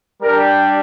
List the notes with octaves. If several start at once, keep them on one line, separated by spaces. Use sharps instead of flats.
G3 D4 G4 A#4